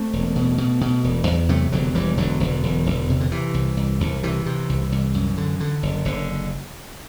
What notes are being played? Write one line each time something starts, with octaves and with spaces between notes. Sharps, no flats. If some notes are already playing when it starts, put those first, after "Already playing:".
Already playing: A3 C4
E1
B2
B2
B2
E1
E2
C3 F#3 A3
E1 D3 F#3
E1 E3 G3
E1 D3 F#3
E1
E1
E1
C3
D3
C3 E3
C2
C2
C2
C3 E3
C3
C2
C2
F#2
D3
D3
F#1
F#1 D3